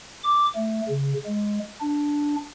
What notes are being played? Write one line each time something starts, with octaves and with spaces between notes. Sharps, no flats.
D6
A3
C#3
G#3
D4